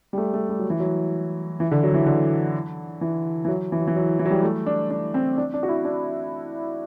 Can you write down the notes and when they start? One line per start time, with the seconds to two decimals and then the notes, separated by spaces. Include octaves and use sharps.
0.13 G3
0.18 A3
0.34 A3
0.49 G3
0.59 F#3
0.70 E3
0.80 F#3
1.60 E3
1.71 D3
1.84 F#3
1.94 E3
2.06 D3
3.01 E3
3.45 E3
3.48 F#3
3.72 E3
3.80 F#3
3.87 E3
3.96 F#3
4.19 E3
4.25 F#3
4.31 G3
4.43 A3
4.66 D4
4.90 D4
5.14 C4
5.38 D4
5.54 D4
5.63 F#4
5.68 E4
5.85 D4